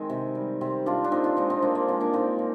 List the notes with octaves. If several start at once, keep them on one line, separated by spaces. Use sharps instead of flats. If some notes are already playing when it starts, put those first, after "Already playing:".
Already playing: D#3 G#3 C4
C3
G3
C3 C4
G3 D4 F4
D4
A#2 C4 D#4
D4 F4
F3 G#3 C4 D#4
C4 D#4
A#2 A#3 D4
A#3
F3 G#3 C4
A#3 D4
A#2 C4 D#4
F3